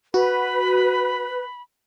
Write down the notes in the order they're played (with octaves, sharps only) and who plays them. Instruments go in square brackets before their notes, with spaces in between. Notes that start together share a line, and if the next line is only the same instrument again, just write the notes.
[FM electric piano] F#4 [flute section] B4 [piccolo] B5